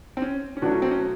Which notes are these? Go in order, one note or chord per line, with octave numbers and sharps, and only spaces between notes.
C4
C#4
C#4
B2 F#3 A3 D4
C#4
C4
C#4